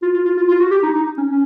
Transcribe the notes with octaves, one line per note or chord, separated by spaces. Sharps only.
F4
F4
F4
F4
F4
F#4
G4
D#4
D#4
C#4
C#4